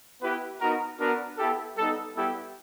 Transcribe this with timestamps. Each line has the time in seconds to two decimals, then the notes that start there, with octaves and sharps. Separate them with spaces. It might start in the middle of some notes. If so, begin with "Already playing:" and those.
0.21 B3 E4 G4 B4
0.60 B3 D#4 F#4 A#4
0.99 B3 D4 F#4 A#4
1.37 B3 E4 G4 A4
1.77 G3 B3 D#4 A4
2.15 G3 B3 E4 G4 A4